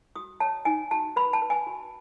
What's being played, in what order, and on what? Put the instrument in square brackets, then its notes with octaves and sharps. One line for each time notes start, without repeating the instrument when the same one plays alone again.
[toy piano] F#4 D#6
C#5 A5
D#4 G#5
F#4 A5
B4 B5
A5
B4
G#5
F#4